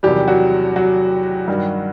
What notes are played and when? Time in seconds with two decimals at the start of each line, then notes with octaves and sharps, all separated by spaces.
0.03 E2 C3 D#3 F#3 G3 G4
0.28 F#3 F#4
0.76 F#3 F#4
1.48 G2 D#3 G3